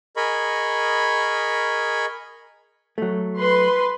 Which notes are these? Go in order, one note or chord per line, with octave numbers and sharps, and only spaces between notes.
G#4 A#4 D#5 B5 C#6
F#3 A3
B4 C6